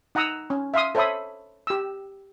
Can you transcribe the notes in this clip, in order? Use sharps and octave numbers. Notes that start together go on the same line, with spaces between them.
D#4 F#5 A#5 D#6 E6
C#4
E5 F5 C6 D#6
A4 C5 C#5 E5 B5 D#6
G4 E6